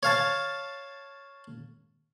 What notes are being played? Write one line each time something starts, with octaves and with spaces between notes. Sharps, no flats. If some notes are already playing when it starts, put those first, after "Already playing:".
C#5 F5 A5